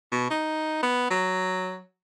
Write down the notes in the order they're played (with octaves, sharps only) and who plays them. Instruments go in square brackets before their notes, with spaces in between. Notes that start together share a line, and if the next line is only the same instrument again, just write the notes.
[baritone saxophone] B2
D#4
B3
F#3